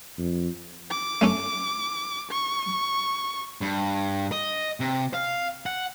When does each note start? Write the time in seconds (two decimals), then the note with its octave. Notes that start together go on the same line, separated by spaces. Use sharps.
0.18 F2
0.91 D6
1.21 A3 C#4 A4
2.31 C#6
3.61 G2
4.32 D#5
4.80 C3
5.14 F5
5.66 F#5